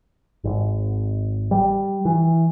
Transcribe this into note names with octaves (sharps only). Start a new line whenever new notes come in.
G#1
G3
E3